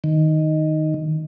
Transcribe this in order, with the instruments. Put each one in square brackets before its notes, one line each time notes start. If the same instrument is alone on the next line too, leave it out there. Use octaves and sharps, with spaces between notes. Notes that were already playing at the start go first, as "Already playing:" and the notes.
[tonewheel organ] D#3